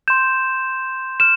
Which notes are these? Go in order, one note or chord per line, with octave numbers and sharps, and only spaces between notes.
C6 G6 E7
F6 E7